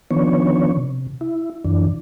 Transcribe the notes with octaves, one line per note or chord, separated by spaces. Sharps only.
D#3 F3 B3 C#4 D4 C#5
C3
E4
F#2 E3 D4